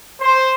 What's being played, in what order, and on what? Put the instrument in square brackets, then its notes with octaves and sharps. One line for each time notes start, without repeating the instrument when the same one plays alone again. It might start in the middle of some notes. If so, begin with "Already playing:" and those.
[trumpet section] C5